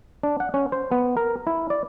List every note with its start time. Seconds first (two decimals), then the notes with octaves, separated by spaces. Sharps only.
0.23 D4
0.40 F#5
0.54 C#4
0.72 C5
0.92 B3
1.17 A#4
1.47 E4
1.70 D5